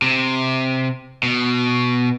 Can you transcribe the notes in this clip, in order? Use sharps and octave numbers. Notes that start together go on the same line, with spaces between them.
C3
B2